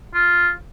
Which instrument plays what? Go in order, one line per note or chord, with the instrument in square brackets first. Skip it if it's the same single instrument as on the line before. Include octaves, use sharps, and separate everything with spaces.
[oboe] F4